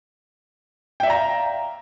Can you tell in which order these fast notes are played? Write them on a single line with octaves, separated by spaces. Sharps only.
G5 E5 D5 A#5 F5